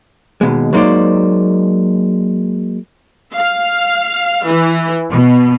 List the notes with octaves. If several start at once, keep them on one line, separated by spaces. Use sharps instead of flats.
D#2 B2 G#3
F#3 G#3 A#3 D#4 C5 D5
F5
E3
B2